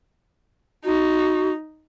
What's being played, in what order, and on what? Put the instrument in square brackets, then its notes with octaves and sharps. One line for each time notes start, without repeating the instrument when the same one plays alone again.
[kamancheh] D#4 [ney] F#4